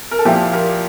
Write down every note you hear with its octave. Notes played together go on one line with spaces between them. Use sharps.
A#4
A4
A#2 F3 E4 G4
G4 A#4